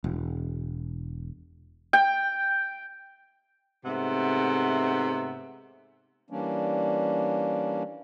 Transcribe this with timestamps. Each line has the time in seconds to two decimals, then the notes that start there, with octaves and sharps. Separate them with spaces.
0.04 E1
1.93 G5
3.85 G#2 C3 A3 B3 E5 F#5
6.30 E3 G3 A#3 C#4 D4